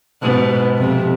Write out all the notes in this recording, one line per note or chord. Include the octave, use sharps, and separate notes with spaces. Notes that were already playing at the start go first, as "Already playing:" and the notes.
G#2 B2
F2 C3